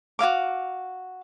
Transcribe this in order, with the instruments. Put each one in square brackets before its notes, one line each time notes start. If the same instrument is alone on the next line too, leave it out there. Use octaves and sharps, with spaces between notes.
[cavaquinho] F#4 D#5 F5 D6